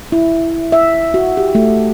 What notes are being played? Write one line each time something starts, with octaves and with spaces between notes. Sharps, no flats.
E4
E5
F#4
G4
A3